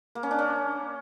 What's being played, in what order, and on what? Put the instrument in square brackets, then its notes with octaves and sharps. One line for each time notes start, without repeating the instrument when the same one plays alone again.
[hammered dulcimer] A#3
C#4
D4
C#4